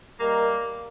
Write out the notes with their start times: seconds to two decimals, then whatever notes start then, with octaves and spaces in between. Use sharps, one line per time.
0.20 G3 A#3 A#4 D#5 A#5